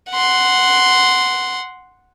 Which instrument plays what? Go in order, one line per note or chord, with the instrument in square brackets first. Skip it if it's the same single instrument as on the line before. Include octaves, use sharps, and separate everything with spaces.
[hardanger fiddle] F#5 C6